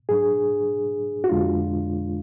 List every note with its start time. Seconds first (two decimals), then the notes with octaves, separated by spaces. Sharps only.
0.09 G#2 F#3 D4 G#4
1.24 F#4
1.29 F2 D3 G#3 D4 F4